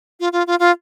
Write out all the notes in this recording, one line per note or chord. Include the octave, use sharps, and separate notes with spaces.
F4
F4
F4
F4